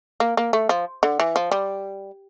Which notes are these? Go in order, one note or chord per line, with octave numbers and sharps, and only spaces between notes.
A#3
A#3
A3
F3
D3
E3
F3
G3